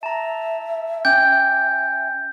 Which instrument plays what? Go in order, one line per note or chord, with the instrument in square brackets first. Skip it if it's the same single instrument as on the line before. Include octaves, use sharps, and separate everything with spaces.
[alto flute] E5 [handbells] A5 A#5
[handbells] C#4 G5 [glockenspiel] G6